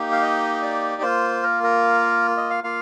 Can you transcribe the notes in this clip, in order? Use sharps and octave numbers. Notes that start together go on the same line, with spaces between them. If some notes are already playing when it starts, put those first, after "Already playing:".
Already playing: A#3 D#4 G4
F5
D#5
D5
A#3 F4 C5
A#4
A#4
D#5
F5
A#3 F4 F5